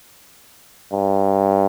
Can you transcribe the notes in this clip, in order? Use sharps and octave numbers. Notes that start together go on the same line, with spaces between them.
G2